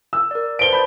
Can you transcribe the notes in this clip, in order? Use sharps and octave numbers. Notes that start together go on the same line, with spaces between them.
E6
A#4 D5
B4 C5 A5 D7 G7
D5 A5 B5 G6